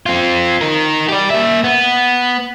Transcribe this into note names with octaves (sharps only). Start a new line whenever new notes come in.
C4 F4
D#4 A#4
G4 D5
A#3 E5
B3